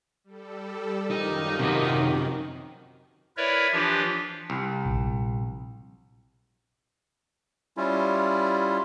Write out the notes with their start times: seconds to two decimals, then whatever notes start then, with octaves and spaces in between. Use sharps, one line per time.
0.24 G3 A4
1.10 F#2 D#3 F3 D#4 G4 A#4
1.59 C3 F#4
3.37 E4 A#4 B4 C#5 D5 E5
3.73 E3 F3 D4 F4 G4
4.50 C2
4.85 A#1
7.77 G3 C#4 E4 F4